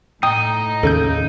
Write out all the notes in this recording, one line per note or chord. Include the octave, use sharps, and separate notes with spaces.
A2 D#4 G5 D#6
D#2 C#3 A4 G6